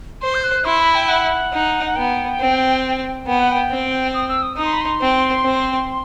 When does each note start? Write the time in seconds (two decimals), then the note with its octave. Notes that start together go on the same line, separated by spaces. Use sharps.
0.22 C5 C6
0.35 G6
0.44 F#6
0.65 E4 C6
0.80 B5
0.95 G5
1.08 F#5
1.53 D#4
1.86 F#5
1.96 B3 G5
2.40 C4
3.27 B3 G5
3.39 F#5
3.51 G5
3.71 C4
4.14 D#6
4.29 E6
4.42 D#6
4.57 D#4 D#6
4.65 C6
4.73 B5
4.81 C6
5.01 C4
5.44 C4